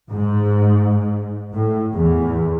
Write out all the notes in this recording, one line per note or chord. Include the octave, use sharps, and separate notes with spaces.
G#2
A2
E2